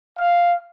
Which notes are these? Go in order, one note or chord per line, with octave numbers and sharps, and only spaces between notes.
F5